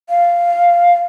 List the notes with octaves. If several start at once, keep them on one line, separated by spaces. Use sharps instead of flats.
F5